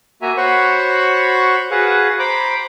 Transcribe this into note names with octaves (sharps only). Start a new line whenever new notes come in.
A#3 F#4 E5 G#5 A#5
F#4 C5 C#5 F#5 B5 C#6
F#4 G#4 B4 F5 F#5
C5 A#5 B5 D6